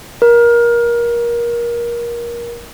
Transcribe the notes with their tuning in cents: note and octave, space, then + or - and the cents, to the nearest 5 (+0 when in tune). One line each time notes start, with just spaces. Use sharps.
A#4 +25